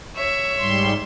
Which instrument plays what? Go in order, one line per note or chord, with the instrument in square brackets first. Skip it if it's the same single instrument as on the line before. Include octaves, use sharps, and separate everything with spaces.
[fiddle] C#5 E5
[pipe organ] G#2 G3 C6